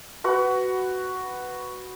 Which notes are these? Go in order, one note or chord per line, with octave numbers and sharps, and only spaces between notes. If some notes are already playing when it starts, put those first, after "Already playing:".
F#4 B4 F#5